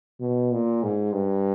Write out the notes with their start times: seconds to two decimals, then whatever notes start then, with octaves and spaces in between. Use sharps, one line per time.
0.20 B2
0.51 A#2
0.83 G#2
1.13 G2